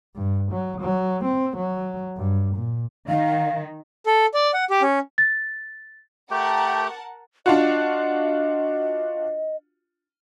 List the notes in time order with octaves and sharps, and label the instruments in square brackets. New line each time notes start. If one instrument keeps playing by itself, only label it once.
[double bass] G2
F#3
F#3
C4
F#3
G2
A#2
[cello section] D#3 [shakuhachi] F5
[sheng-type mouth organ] A4
D5
F#5
G4
C#4
[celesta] A6
[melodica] A3 G4 G5 [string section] A#4 F#5 A5
[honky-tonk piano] D4 F4 F#4 [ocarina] D#5